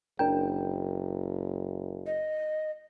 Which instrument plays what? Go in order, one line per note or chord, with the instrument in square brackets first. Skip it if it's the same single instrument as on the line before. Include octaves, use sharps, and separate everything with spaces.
[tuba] F#1 [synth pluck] D4 A#4 G5
[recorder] D#5